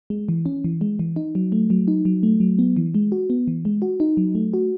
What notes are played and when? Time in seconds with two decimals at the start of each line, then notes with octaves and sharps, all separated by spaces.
0.10 G#3
0.29 E3
0.46 C#4
0.64 E3
0.81 G#3
0.99 E3
1.16 D#4
1.35 F#3
1.52 A3
1.70 F#3
1.88 D#4
2.05 F#3
2.23 A3
2.40 F#3
2.59 B3
2.77 E3
2.95 G#3
3.12 F#4
3.30 B3
3.48 E3
3.65 G#3
3.82 F#4
4.00 D#4
4.17 F#3
4.35 A3
4.53 F#4